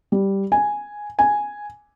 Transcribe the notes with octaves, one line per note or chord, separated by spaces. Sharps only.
G3
G#5
G#5